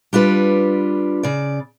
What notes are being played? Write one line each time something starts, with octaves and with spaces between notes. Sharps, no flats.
G3 D4 F4 B4
C#3 D5